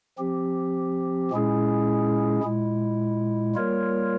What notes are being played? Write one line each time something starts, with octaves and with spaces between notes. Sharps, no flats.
F3 C4 G4
A#2 G#3 C#4 E4 G#4
A#2 G#3 E4
G3 A#3 F4 A#4 C#5